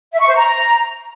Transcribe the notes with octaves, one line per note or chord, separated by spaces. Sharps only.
E5
C#6
C5
A#5